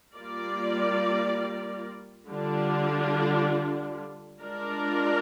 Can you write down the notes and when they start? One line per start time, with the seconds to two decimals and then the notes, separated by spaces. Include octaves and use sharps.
0.14 G3 A#3 F4 A#4 D5
2.28 D3 G3 D4 F4
4.41 G#3 D4 F4 A#4 D5